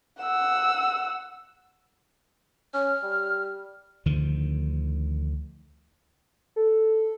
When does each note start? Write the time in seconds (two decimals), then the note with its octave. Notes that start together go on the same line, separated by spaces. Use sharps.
0.22 F#5 E6
2.74 C#4 F6
3.03 G3
4.06 D2 D3 D#3 F3
6.56 A4